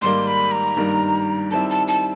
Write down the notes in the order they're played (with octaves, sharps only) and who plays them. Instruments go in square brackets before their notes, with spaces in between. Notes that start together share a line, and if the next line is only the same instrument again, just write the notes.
[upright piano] G#2 D#3 G3 A#3 [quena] C6
[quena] B5
A#5
[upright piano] G2 D#3 G3 A#3
[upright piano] D#3 G3 C4 E4 [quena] A5
[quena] A5
A5